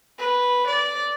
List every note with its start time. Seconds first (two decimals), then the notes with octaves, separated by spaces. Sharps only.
0.18 B4
0.66 D5